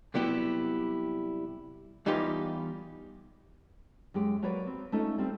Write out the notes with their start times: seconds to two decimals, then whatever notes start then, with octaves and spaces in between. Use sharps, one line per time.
0.14 C3 F#3 G3 B3 E4 G4
2.06 E2 G3 D#4 F4 G4 B4
4.14 F#2 G#3 G4
4.42 F#3 A#3 F#4 B4 C#5 D5
4.66 C4
4.92 A3 C#4 D#4 F4
5.18 G3 C4